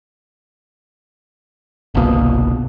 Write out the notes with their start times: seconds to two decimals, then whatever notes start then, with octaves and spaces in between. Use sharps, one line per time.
1.95 G1 C2 B2 A#3